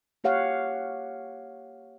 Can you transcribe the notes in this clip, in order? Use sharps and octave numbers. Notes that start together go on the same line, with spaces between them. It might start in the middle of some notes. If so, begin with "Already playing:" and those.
A#3 G4 C#5 F5 F#5